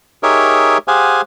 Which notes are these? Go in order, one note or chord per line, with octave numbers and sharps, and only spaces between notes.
D#4 G4 G#4 A#4 C#5 E5
G4 G#4 C5 F5 F#5 G#5